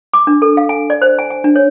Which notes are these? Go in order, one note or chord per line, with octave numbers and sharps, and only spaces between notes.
D6
D4
A4
F5
G#5
D5
C5
G#5
G#5
D4
C#5